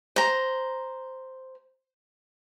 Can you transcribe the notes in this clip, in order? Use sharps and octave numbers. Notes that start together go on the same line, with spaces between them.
C5 A#5